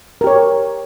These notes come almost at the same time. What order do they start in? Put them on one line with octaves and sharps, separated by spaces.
A#4 G4 C#5